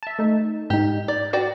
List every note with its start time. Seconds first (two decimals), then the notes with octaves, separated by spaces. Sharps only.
0.03 E5 A5
0.19 A3 D#4
0.70 G#2 D#4 G4
1.08 D5
1.33 F#4 D5 G5